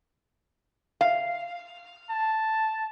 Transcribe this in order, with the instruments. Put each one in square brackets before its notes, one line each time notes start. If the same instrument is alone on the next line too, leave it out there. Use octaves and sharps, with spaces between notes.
[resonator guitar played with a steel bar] F5
[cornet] A5